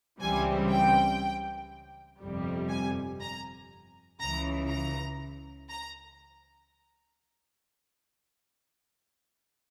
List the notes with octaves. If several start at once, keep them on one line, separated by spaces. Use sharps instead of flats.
C#2 C#3 E3 G3 C4 G#5
G5
G1 F2 C3 G3
G#5
A#5
C#2 C#3 E3 A#5
A#5
A#5